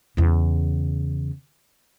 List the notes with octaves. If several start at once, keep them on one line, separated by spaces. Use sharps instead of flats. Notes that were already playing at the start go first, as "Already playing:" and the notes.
E2 C#3